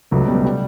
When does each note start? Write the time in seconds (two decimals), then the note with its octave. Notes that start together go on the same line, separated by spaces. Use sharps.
0.11 C#2 F#3 A3
0.27 B2 G3 B3
0.45 G3